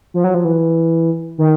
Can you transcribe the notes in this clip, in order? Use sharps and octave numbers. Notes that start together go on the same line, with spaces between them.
F3
F#3
F3
E3
D#3